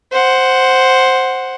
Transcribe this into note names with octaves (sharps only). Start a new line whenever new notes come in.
C5 F#5